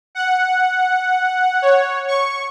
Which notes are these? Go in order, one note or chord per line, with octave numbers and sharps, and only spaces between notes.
F#5
C#5
C#6